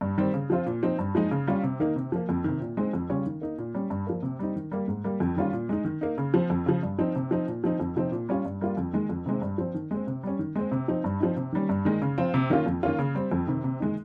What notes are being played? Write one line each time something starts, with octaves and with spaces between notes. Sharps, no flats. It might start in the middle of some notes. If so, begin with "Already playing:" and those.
G2
D#3 G3 C4
C#3
F3 C4 F4
A#2
F3 C4 D#4
G2
F3 G#3 D#4
C#3
G3 C#4 F4
C3
D#3 A#3 D#4
C3
F3 A#3
F2
C3 D#3
A#2
G#3 C4 D#4
F2
C#3 G3 C#4 F4
D#3
A#3 D#4
A#2
G3 C#4
G2
F3 A#3
C3
G3 C4 D#4
D#3
G3 A#3
G#2
G3 A#3
F2
D#3 G3 C#4 F4
A#2
G#3 D#4
D#3
A#3 D#4
C#3
F3 C4
F2
C#3 F3
G2
F3 C4 D#4
C3
F3 C4 D#4
A#2
F3 C4 D#4
F2
C3 F3 C4 D#4
A#2
G3 C#4 F4
G2
G3 A#3 F4
F2
D#3 G#3
F2
C3 D#3 G#3 C4
G2
F3 C4
D#3
G#3 C4
C3
G3 C#4
D#3
G#3 C4
C3
F3 C4 D#4
G2
F3 C4 D#4
C3
D#3 G3 C#4
G2
D#3 G#3 D#4
C#3
F3 C4 F4
C3
D#3 A#3 C#4 F4
F2
D#3 A#3 C#4 F4
C#3
G3 C4
F2
C3 D#3
C3
D#3 G#3 D#4